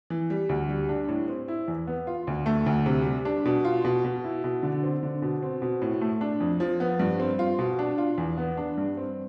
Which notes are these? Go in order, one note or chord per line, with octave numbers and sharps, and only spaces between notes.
E3
G3
D2
G3
D4
A2
C4
E4
E2
B3
F4
D2
A3
D2
C3
G3
D4
B2
F4
B2
B2
E4
B2
D3
C4
D3
B2
C4
B2
A2
A3
D4
F2
F3
B3
G2
C4
F4
B2
D4
F4
E2
B3
D4
G2
C4